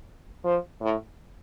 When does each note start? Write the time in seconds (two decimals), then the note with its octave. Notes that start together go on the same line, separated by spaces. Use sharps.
0.45 F3
0.82 A2